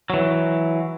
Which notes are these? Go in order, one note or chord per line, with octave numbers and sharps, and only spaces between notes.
E3 F#3